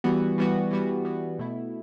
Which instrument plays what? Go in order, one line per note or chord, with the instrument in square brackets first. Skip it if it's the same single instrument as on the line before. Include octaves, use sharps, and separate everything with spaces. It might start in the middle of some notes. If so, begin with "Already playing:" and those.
[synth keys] E3 G3 B3 F#4
E3 G3 B3 F#4
E3 G3 B3 F#4
E3 G3 B3 F#4
B2 A3 E4